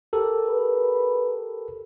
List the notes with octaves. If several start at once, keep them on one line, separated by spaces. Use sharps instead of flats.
G4 A4 A#4
B4